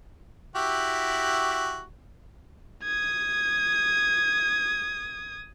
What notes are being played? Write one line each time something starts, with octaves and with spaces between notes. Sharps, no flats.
E4 F#4 G4
D#6 G#6